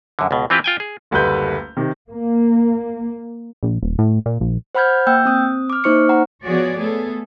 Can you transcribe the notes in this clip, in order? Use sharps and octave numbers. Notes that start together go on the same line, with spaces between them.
F#2 D3
C#2 B2
E3 C4 F4 G4 B4
F4 G5 G#5
G#4
F#1 D2 G3 A3 B4 G6
C3 D#3
A#3
A#1
D#1
A2
A#2
A#1
C5 F#5 B5 F6 G6 G#6
A#3 G5 E6 G6
C4 D#6
D6 F6
A#3 D#4 C5 C#6 F6 C#7
F#5 A#5
F3 B3 F#4 G#4 C#5 D5
A3 B3 G#4 A4